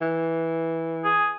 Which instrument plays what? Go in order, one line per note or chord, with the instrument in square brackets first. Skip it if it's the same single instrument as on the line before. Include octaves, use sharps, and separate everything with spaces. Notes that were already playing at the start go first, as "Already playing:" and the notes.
[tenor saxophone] E3
[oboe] G#4